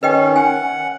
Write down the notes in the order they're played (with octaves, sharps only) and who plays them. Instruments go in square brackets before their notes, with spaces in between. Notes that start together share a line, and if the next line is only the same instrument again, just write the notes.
[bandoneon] D#3 C#4 [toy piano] B4 D#5 G5
[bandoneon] F#5 [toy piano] G#5